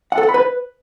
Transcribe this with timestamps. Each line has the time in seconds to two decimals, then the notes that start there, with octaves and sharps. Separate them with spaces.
0.12 F#5
0.18 A4
0.23 F#5
0.29 B5
0.34 B4